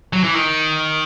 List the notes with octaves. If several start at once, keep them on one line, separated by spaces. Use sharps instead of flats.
F#3
E3
D#3